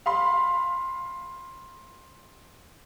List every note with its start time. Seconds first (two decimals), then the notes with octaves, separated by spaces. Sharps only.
0.06 F5 B5 C6